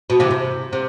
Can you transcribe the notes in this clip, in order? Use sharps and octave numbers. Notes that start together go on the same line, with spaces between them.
B2
C3 E3
C3
C3